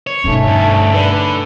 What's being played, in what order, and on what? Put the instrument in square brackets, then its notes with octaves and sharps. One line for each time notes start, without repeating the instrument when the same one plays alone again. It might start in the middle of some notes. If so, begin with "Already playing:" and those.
[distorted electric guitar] C#5
[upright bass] G2 B2 [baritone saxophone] A3 [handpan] C#4 D#4
[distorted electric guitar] D2
[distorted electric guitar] D3 [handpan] D4 B4 D5